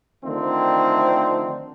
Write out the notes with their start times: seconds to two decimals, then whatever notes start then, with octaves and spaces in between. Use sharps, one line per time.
0.24 D3 D#3 F3 A3 C4